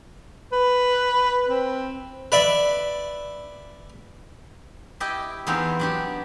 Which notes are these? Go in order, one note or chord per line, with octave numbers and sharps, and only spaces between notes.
B4
C4
B4 D5 E5
E4 G4 D#5 G5
E2 B3 C4 D#4 F5 G5
F#3 D4 G4